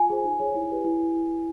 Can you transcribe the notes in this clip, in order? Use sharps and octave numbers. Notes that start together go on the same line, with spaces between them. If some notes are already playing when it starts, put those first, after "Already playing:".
Already playing: F4 G#5
G#4 C5
D#4
G#4 C#5
E4
G4 B4
E4